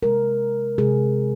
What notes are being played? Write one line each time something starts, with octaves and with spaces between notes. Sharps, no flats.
C3 G#3 A#4
C3 G#3 G#4